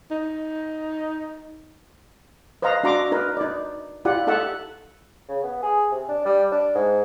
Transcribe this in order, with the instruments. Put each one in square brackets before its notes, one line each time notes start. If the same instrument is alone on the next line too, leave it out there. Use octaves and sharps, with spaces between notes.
[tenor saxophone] D#4
[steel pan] B4 C5 D#5 F5 A#5
D4 F#4 E5 A#5 C6 D6
D#4 A#4 B4
D#4 D5
E4 F4 G4 D5 F#5
D#4 A4 E5 F#5 A5
[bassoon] C#3
B3
G#4
C3
D4
G3
D4
G#2